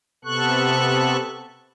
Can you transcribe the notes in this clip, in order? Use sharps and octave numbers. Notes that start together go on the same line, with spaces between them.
C3 B3 A4 C#6 F#6